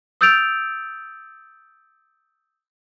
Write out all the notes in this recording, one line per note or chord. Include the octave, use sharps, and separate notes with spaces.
D#6 E6 G6 A6 D7 F7